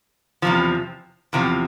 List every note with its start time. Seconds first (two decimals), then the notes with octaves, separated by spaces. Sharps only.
0.42 E2 C3 F3
1.33 E2 C3 F3